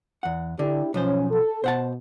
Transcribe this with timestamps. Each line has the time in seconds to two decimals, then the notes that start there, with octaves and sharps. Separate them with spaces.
0.23 E2 F#5
0.59 D3 D4 E4 G4
0.94 B1 F3 C#4 C5
1.31 A4
1.64 B2 C5 F#5 A5